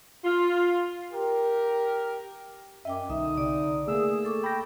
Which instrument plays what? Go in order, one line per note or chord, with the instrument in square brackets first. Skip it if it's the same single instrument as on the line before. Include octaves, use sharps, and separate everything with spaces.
[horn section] F4
[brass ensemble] G4 A#4
[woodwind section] F#2 [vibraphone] D#5 G5 D6 [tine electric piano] E5
[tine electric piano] B1 [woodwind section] D3 D#4 D#6 [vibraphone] E5
[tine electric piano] C3 [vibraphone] D5
[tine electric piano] A3 A#3 [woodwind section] G#4 E6
[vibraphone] A4 C#6 D6
[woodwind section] G5 [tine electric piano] B5 A#6